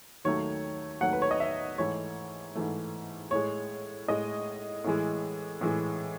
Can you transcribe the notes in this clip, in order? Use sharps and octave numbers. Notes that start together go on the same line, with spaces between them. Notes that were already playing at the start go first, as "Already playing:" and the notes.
D#2 D#3 F#3 A3 C#5
D#2 D#3 F#3 A3 F#5
B4
C#5
D#5
E5
G#2 E3 A3 C#5
G#2 E3 A3
A2 G#3 C#5
A2 G#3 D#5
A2 E3 G#3
A2 E3 G#3